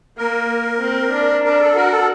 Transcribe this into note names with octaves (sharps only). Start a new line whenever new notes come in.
A#3 A#4
C4
D4
D4 A#4
A4
F#4 A#4
A4